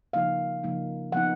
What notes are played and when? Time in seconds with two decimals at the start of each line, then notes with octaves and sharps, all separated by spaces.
0.13 C#3 F3 A#3 D#4 F5
0.63 C#3 F3 A#3 D#4
1.12 F3 B3 D#4 F#5